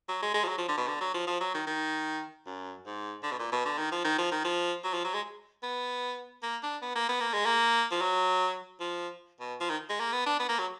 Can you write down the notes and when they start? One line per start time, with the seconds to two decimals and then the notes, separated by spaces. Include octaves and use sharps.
0.09 F#3
0.22 G#3
0.34 G#3
0.44 F3
0.48 F#3
0.58 F3
0.68 D3
0.77 B2
0.88 D3
1.00 F#3
1.14 F3
1.27 F3
1.41 F#3
1.54 D#3
1.67 D#3
2.46 F#2
2.86 G#2
3.23 D3
3.31 B2
3.39 A#2
3.52 B2
3.65 D3
3.78 D#3
3.92 F3
4.05 D#3
4.18 F3
4.31 D#3
4.44 F3
4.84 F#3
4.93 F3
5.04 F#3
5.14 G#3
5.63 B3
6.43 A#3
6.63 D4
6.82 B3
6.95 A#3
7.09 B3
7.20 A#3
7.34 G#3
7.46 A#3
7.91 F3
8.01 F#3
8.80 F3
9.40 B2
9.60 F3
9.70 D#3
9.89 G#3
10.00 A#3
10.12 B3
10.26 D4
10.40 B3
10.49 A#3
10.59 F#3